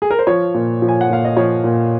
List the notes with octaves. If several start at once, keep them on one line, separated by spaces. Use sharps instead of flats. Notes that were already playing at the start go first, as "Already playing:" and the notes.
G#4
A#4
C5
F3 C#5
A#2
F3
G#5
F#5
A#2 F5
D#5
F3 C#5
A#2